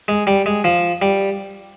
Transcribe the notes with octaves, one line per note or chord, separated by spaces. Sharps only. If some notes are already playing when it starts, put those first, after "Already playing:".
G#3
G3
G#3
F3
G3